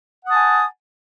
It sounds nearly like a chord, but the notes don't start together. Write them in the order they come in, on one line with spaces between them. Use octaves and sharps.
F#5 D#6 A5 G#5